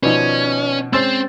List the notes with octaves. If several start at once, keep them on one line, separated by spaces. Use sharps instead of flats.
B2 D#3 F3 C#4 B4 D5 D#5
G#3 C4 C#4 C5 C6 E6 A6